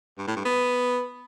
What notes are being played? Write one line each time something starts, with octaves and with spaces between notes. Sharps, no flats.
G2
A2
G2
B3